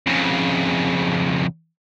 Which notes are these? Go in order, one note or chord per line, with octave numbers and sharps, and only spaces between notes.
F2 C#3